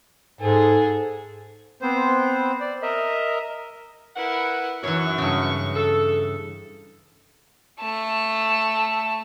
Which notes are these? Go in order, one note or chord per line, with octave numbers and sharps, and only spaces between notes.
G#2 G#4 A4
B3 C4 C5
D5
A#4 D#5 E5
E4 A#4 B4 F#5
F#2 E3 C#5 C#6
G2 C#3
A4
A3 A5